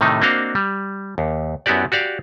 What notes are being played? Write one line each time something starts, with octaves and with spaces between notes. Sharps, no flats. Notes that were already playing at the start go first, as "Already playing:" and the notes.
A2 C3 D#3 A3 D#4
A#3 C4 D4 F#4 D#5 F5
G3
D#2
F#2 B3 E4 F#4 G4 D5
F#4 G4 D5 F5